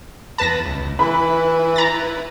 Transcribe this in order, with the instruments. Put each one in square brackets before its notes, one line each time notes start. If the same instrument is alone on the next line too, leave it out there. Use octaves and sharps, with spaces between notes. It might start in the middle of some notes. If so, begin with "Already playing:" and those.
[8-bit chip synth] E2 B4 B5 [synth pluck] A5 A#6
[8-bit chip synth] C#2
[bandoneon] E3 [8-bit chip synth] E4 B4 [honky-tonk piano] B5
[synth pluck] A#5 A6